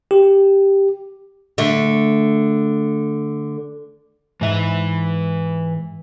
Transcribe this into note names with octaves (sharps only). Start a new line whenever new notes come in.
G4
D3 A3
G#2 E3 E5